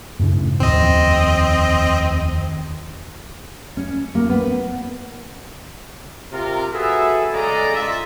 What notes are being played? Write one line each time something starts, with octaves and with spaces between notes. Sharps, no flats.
F#2 A2 C#3
F1 D#2 C4 D#5
C#4
A#3
B3
C3 F4 A#4
F#4 G#4 A4 B4 E5
C#3 G#3 A4 D5 D#5 A#5
F4 E5